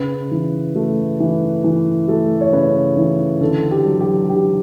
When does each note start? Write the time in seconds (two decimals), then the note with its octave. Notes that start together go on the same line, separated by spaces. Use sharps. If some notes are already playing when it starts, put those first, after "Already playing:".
Already playing: C#3 B4
0.31 E3
0.75 A3
1.20 E3
1.64 E3
2.08 A3 A4
2.41 C#5
2.53 C#3 B4
2.97 E3
3.41 D3 A4
3.71 G4
3.85 F#3
4.00 G4
4.29 D3 G4